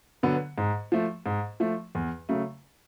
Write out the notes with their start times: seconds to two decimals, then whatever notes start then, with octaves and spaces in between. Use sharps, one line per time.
0.23 D3 F#3 B3
0.58 G#2
0.92 F3 A3
1.26 G#2
1.60 F3 A3
1.95 E2
2.29 C#3 F#3 A3